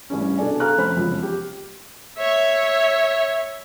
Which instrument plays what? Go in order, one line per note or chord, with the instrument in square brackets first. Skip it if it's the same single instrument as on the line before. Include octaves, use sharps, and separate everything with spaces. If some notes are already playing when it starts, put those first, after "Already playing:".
[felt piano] A1 G2 C#4
B2 D4 A4 D5 G#5
A4 F5 G#5 A#5 F6 F#6
F1 C#4 C5 B5
E1 F2 C#3
G4
[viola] C#5 E5